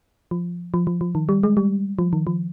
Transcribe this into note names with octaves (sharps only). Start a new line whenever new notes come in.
F3
F3
F3
F3
D#3
G3
G#3
G3
F3
D#3
F3